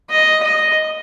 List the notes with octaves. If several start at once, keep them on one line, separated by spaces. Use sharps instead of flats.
D#5
D#5